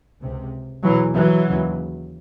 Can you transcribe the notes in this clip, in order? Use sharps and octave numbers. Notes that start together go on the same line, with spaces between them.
C#2 C3
E2 B2 E3 F#3
E3 F#3
D#2 C#3